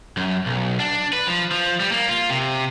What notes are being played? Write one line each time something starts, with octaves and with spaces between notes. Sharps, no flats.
F#2
B1
D4
B4
F3
F3
G3
A#3
F4
C3